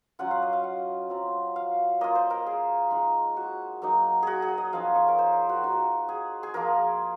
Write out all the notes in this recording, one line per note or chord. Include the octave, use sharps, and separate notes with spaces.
F#3 C#4 F4 F#5
F5
D#5
F5
F#5
F#3 C4 F4
F5
A#3 F4 D#5
C5
A#4
G#4
G#3 D#4
F#4
F#3 A#3 D#4
F#4 G#4
G#4
D#5
F3 C4 D#4 F5
C#5
A#4
C5
A#4
F#4
A#3 D#4 F#4
G#4
G#4
F3 A#3 F4 A#4